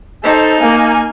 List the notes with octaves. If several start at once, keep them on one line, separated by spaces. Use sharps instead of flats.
D#4 A4 C5
A#3 G#5